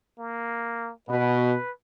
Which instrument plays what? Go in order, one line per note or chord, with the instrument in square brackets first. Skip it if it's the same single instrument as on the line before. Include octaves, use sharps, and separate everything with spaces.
[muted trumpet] A#3
[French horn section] B2 [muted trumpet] B4